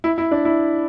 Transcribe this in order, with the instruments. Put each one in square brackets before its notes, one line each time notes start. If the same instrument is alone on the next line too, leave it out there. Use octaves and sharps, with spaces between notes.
[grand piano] E4
E4
D4
E4